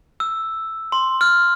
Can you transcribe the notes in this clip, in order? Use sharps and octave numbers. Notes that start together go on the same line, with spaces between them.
E6
C6
F6